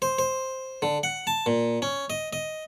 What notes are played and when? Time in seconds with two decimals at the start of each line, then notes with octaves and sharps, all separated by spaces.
0.02 C5
0.19 C5
0.82 D3
1.03 F#5
1.27 A5
1.46 A#2
1.82 C#4
2.10 D#5
2.33 D#5